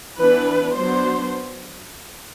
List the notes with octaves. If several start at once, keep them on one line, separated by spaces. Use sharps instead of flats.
E3 B3 D4 B4
F#3 B3 D4 C5